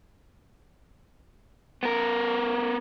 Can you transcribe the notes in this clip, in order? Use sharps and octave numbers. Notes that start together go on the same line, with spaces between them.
B3 A#4